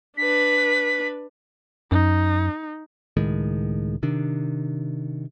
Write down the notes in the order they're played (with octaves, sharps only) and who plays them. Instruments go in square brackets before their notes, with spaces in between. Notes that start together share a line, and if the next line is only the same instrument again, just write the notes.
[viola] D4 B4 [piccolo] B6
[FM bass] F#2 [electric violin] D#4
[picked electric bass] C#2 A2 D#3 G#3
C3 D#3 D4